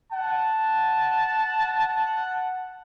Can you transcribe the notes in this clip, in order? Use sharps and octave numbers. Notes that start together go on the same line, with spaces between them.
F#5 A5